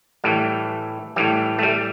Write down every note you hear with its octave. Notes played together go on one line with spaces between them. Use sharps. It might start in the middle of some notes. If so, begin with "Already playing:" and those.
A2 E3 G3
A2 E3 G3
A3
G3